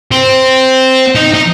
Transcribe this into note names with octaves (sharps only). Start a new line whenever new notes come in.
C4
D#4
D#4